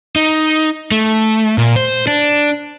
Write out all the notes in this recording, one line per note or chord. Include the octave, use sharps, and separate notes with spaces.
D#4
A3
A#2
C5
D4